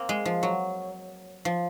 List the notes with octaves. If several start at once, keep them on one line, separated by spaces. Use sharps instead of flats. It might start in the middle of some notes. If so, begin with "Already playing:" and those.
Already playing: A#3 C4
G#3
F3
F#3
F3